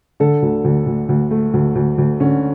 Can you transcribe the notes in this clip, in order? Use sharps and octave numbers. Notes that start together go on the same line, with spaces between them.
D3 A4
D2
D2
D2
D2
A3
D2
D2
D2
D3 C#4